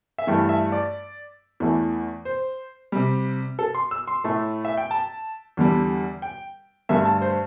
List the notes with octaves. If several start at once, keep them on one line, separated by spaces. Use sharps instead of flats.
E5
G2 E3 A3 G5
E5
D5
E2 E3 A3
C5
C3 G3
A4
C6
E6
C6
A2 A3
E5
G5
A5
E2 D3 G3
G5
G2 D3 A3 E5
A5
C5